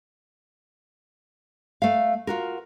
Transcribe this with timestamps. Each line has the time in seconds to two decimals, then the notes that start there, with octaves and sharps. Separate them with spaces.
1.82 A3 F5
2.27 F4 F#4 A#4